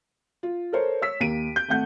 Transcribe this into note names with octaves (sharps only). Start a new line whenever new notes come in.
F4
A4 A#4 C5 C#5
C#5 E6 B6
D#2 A#3 D7 D#7
G6
G#1 A3 F#5 G6